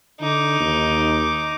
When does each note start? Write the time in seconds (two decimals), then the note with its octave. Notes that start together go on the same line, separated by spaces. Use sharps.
0.21 D3 D#4 D6
0.60 D#2